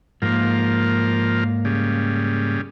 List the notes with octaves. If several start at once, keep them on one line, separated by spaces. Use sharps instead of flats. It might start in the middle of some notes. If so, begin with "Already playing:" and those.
G#2 F3 A#3 A#4
C#3 G3